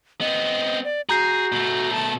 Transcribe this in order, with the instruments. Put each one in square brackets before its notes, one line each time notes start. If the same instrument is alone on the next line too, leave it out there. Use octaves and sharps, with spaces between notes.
[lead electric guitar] B3 C4 [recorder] D#5
[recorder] D5
[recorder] F#4 [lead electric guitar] G#4 [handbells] A#5 G6 C7
[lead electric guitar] B2 A3
[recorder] A5